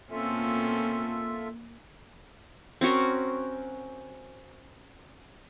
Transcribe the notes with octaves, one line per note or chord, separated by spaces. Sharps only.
B2 A#3 C4 C#4 F4 A4 E5
C4 C#4 F#4 A#4